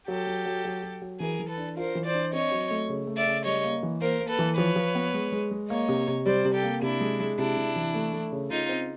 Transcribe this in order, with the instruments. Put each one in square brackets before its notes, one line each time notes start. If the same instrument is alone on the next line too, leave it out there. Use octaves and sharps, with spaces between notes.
[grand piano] F#3 [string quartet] G4 A4
[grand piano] F#3
F#3
F#3
F#3
F#3
[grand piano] E3 [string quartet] G#4 A#4
[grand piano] E3
[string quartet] A4 B4
[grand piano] D4
[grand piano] F4 [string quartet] A#4 C5
[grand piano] E3
[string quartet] C5 D5
[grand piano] D4
[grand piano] C4 [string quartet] C#5 D#5
[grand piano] F#3
A3
C#3
A3
[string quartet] D5 E5
[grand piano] C#3
[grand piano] G3 [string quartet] C#5 D#5
[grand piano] A#3
E3
[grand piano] A#3 [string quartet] A#4 C5
[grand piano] A#3
[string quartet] A4 B4
[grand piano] E3
[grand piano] F3 [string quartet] B4 C#5
[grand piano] F3
B3
G#3
G#3
G#3
[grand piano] A#3 [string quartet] C#5 D#5
[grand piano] C3
C3
[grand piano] G3 [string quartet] C5 D5
[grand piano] C3
[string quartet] G4 A4
[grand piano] A#3
[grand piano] C3 [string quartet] D4 E4
[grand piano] G#3
G#3
[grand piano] C3 [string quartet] D4 E4
[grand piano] C3
E3
A3
A3
C#3
[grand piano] C#3 [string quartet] D#4 F4
[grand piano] C4